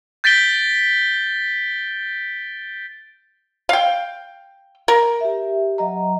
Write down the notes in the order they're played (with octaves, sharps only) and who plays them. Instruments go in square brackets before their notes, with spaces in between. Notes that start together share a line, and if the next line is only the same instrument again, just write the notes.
[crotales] G6 A6 B6 D7 G7
[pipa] F5 G5
A#4
[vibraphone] G4 E5
F#3 D#5 A#5